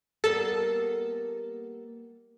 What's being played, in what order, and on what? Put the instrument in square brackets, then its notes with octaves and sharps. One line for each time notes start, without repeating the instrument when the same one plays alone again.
[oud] G3 A#3 B3 [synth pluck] A4